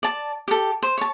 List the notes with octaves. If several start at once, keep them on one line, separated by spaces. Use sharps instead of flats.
D5 A5
G4 A4
C5
C#5 A5